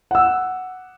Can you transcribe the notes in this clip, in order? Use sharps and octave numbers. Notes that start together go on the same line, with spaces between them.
F#5 E6